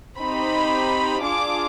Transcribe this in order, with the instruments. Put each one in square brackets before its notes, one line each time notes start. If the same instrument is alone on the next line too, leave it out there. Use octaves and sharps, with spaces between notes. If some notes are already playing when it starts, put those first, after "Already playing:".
[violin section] C4 D#4 G4 B5
D4 F4 G#4 D6